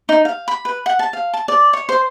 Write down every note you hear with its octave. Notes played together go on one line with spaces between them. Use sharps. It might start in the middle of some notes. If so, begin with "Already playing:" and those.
D#4
F5
B5
B4
F#5
A5
F5
A5
D5
C#5
C5